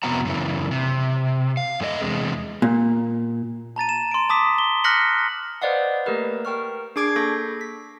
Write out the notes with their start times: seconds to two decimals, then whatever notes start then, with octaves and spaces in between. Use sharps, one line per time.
0.03 F2 C3 B3 F#4 F#5 A#5
0.25 F#2 C#3 E3
0.71 C3
1.57 F5
1.80 F#2 A3 F#4 D#5
2.00 E2 C3 G#3
2.62 A#2
3.76 A5 A#5 A6 D#7
3.89 E7
4.11 C6 D7
4.29 A5 D6 D#6 B6
4.58 G7
4.84 F6 F#6 A#6 B6 C#7 F#7
5.61 B4 C5 D5 D#5 F5 F#5
6.06 A3 A#3 G4 A#4 B4
6.45 A#4 G5 C#6 F6
6.96 D4 G#4 D6 G#6 C7 D7
7.16 A#3 A4 C#6 G6 A#6
7.61 B6